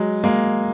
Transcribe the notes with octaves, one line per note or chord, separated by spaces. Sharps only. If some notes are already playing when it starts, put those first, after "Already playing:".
Already playing: F#3 G#3
G#3 A#3